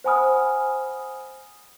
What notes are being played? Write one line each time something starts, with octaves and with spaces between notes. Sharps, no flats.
C5 F#5 G#5 B5 D#6 F6